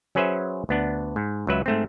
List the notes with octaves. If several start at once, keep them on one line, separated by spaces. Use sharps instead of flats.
F#3 C#4 G#4 B4 C5 E5
D2 B3 D4
G#2
C#2 F#3 B4 E5
G#2 A3 C4